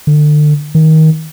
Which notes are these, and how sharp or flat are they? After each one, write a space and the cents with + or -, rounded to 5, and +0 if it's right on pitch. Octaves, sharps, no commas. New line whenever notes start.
D3 +30
D#3 +20